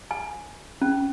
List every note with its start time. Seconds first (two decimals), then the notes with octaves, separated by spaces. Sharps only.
0.11 G#5
0.82 C#4